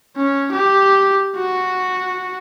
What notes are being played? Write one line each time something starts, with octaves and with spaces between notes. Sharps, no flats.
C#4
G4
F#4